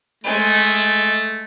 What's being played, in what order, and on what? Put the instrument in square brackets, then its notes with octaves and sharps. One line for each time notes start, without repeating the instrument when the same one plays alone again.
[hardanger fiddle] G#3 [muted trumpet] A3